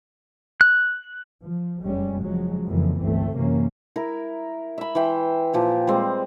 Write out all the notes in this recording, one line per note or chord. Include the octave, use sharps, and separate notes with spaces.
F#6
F3
F1 F#2 G3 G#3 C#4
C#3 F3 F#3 G#3
F2 C#3 E3 F3 A#3
G1 C#2 A3 C4
F#2 C3 E3 A#3 C#4
E4 A#4
E5 B5
E3 E5 G5 C6
A#2 F3 G4
G3 G#3 C4